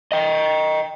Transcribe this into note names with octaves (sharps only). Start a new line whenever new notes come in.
D#5 G5